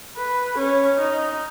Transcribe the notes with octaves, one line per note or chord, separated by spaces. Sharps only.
B4
C#4
D#4